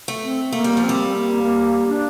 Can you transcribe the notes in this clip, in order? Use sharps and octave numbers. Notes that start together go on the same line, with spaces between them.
A3
C4
A3 A#3
G3
F3
C4
G3
A#3
A#3
D4